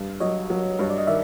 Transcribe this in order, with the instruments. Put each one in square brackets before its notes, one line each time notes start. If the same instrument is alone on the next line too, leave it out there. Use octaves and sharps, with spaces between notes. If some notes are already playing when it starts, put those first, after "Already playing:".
Already playing: [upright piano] G2
[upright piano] F#3 [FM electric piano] C#5 D#5
[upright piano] F#3
[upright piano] G2 [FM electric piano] C#5
[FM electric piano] D5
D#5
[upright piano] D#3 [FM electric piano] D5 E5